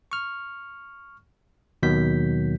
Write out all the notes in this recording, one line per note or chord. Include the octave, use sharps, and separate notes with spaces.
C#6 F6
D#2 B2 D#3 F#3 G6 B6